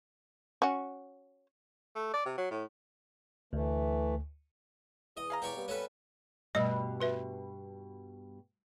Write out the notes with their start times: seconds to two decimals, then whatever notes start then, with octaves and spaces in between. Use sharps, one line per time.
0.62 C#4 F#4
1.96 A3
2.14 D5
2.26 C3
2.38 F#3
2.51 A2
3.53 D2 E3 A3
5.17 E2 D#5 D#6
5.30 G#4 F5 A#5
5.42 E2 G4 C#5 D5
5.56 G3 A#3 B3
5.68 C#4 A4 B4
6.55 G2 B2 G3 A3 D#5
7.00 F#4 B4 E5